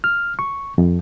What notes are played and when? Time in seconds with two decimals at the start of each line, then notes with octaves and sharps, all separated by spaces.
0.04 F6
0.39 C#6
0.78 F2